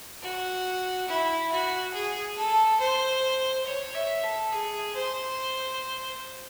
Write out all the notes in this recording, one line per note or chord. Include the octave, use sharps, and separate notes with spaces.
F#4
E4
F#4
G#4
A4
C5
C#5
E5
A4
G#4
C5